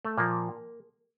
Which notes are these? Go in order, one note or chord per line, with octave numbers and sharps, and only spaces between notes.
A3
A#2 F3 A#3